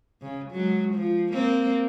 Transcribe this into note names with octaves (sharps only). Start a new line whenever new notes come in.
C#3
F#3 G#3
F3
A#3 C4